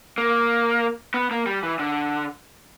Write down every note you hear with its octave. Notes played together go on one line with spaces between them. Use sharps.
A#3
B3
A#3
G3
E3
D3